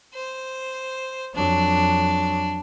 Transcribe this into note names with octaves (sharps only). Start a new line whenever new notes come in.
C5
F2 F#3 D4